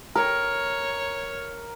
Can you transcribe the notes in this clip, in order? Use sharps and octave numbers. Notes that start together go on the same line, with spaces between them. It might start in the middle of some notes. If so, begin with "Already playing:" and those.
A#4 C#5